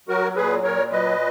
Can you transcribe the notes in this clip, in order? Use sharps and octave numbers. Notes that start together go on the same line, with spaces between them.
F#3 F#4 A#4
A#2 G#4 B4
A#2 A#4 C#5
F#3 B4 D#5